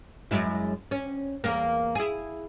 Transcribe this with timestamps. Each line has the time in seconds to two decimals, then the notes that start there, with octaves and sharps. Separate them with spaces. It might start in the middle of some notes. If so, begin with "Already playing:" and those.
0.31 F#2 G#3 E4
0.91 C#4
1.44 E2 A#3 A#4
1.95 E4 G#4